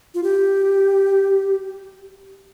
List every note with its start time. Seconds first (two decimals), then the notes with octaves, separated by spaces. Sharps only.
0.14 F4
0.23 G4